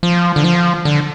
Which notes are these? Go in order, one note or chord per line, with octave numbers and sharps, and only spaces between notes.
F3
D3
F3
D3